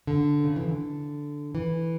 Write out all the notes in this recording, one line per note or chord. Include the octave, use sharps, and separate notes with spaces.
D3
C#3
E3
D3
E3